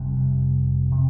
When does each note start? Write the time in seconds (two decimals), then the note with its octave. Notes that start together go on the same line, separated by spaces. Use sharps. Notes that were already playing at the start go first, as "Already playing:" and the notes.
Already playing: F1 F2 C3 G3
0.91 C3